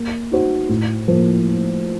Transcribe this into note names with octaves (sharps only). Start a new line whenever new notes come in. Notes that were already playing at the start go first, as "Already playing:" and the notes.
Already playing: A#3
D#4 F#4 C5
A2
F3 A#3